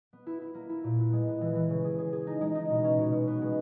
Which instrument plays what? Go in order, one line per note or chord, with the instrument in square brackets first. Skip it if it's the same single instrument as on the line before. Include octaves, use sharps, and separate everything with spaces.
[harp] B3
E4
E4
A#3
E4
A#2
B3
G#3
B3
E3
E3
C#3
G#4
G#4
G#4
D#4
G#3
D#4
B2
C#4
B2
B2
B3
G#3